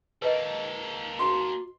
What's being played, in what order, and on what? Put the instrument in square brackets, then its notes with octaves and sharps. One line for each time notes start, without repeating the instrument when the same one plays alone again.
[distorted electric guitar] A#3 A4 [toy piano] B4 D#5
[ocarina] F#4 [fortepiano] C6